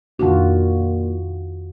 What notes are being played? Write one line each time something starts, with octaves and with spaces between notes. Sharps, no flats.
F2 A#2 D#3 D4 F4 F#4